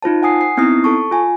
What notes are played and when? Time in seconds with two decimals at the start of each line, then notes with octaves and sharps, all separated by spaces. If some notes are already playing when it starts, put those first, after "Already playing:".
0.02 D#4 F4 C5 A5
0.23 F#5 G#5 D#6 C7
0.41 C7
0.57 B3 C4 D#4 E4 D#6 C7
0.84 A4 A5 C#6
1.11 F4 G#5